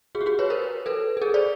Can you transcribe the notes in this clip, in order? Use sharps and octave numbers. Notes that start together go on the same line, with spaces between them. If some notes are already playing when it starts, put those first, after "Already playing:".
F#4 G#4
G4
F#4 G#4
B4 C#5
A#4 C5
A4 B4
A4
G#4 A#4
C5 D5